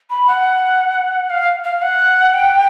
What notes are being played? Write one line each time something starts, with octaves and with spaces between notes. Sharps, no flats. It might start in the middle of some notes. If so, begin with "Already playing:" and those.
B5
F#5
F5
F5
F#5
G5